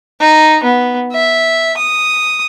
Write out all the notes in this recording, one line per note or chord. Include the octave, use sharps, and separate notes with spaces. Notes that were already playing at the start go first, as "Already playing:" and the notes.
D#4
B3
E5
D#6